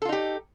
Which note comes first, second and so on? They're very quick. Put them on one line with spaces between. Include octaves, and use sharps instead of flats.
A4 F4 D#4 G4